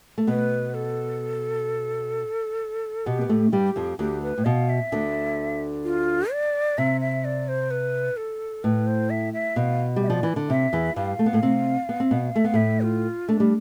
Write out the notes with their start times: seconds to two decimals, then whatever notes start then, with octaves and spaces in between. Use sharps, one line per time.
0.18 A3
0.27 B2 B3 B4
0.74 A4
3.06 B2 B3 G4
3.21 B3
3.29 A2 A3
3.52 G2 G3 G4
3.76 F2 F3
3.99 D2 D3 G4
4.22 B4
4.38 A2
4.45 B2 F5
4.69 E5
4.92 D2 D3
5.84 F4
6.32 D5
6.78 C3 E5
7.01 E5
7.25 D5
7.48 C5
7.71 B4
8.17 A4
8.64 A2 B4
8.87 C5
9.10 E5
9.33 E5
9.56 B2 F5
9.96 G3
10.03 E5
10.08 F3 D5
10.23 E3
10.36 D3
10.49 C3 E5
10.73 E2 E3
10.96 G2 G3 F5
11.19 A3
11.26 B3
11.33 A2 A3
11.43 C3 C4
11.89 B3
12.00 C4
12.11 B2 B3
12.36 A3 E5
12.44 B3 F5
12.54 A2 A3 E5
12.82 F4
13.29 A3 D4
13.40 G3